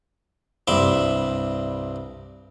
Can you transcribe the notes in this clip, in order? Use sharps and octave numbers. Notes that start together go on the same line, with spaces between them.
C2 G2 E5 B5 C6 D6